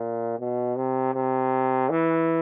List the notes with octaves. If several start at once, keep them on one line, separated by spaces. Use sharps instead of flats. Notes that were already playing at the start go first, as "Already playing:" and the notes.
Already playing: A#2
B2
C3
C3
E3